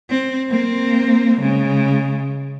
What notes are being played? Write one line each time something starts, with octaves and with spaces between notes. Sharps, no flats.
C4
A#3 C4
C#3 G#3